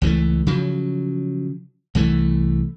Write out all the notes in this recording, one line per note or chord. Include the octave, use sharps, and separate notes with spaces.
C#2 E3 G#3 A3
C#3 F3 F#3
C2 E3 A3